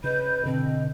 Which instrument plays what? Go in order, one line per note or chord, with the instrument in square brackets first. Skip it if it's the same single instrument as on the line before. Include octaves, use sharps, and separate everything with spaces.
[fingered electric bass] C#3 [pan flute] B4 [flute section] D#5 B5 G6
[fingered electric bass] B2 D3 [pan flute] C4
[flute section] D#5